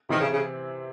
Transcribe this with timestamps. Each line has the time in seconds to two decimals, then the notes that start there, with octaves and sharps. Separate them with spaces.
0.09 C3 D#3 E3 C4
0.21 C#3
0.32 C#3